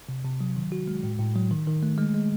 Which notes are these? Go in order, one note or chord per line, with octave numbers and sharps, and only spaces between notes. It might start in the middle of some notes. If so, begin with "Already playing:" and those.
C3
C3
F#3
D#3
F#4
G#3
A2
A2
F#3
D#3
D#3
A3
G#3
G#3